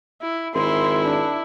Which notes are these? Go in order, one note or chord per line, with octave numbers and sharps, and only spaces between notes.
E4
G#1 E4 C6
D4